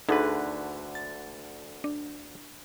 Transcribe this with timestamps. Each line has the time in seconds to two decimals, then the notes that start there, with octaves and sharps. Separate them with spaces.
0.09 D2 D3 D#4 G#4 A4 B4
0.95 A6
1.84 D4